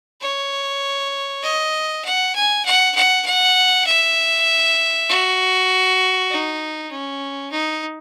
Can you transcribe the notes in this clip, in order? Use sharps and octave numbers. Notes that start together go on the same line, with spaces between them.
C#5
D#5
F#5
G#5
F#5
F#5
F#5
E5
F#4
D#4
C#4
D#4